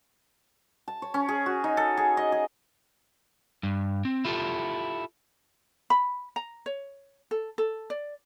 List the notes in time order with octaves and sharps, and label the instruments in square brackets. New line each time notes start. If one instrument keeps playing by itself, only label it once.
[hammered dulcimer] A5
C#5
C#4
G#4
F#4
D#4
A4
G#4
D#5
G#4
[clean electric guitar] G2
C4
E4 F4 G4 A4
[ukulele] B5
A#5
C#5
A4
A4
D5